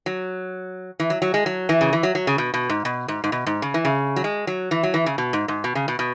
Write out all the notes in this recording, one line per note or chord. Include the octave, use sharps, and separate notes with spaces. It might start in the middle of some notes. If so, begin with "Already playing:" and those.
F#3
E3
F#3
F#3
G#3
F#3
E3
C#3
E3
F#3
F#3
C#3
B2
B2
G#2
B2
G#2
G#2
B2
G#2
C#3
E3
C#3
F#3
G#3
F#3
E3
F#3
E3
C#3
B2
G#2
G#2
B2
C#3
B2
B2